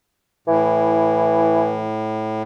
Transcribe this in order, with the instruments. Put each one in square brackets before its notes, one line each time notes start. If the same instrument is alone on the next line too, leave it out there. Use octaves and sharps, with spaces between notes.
[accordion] A2 [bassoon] E3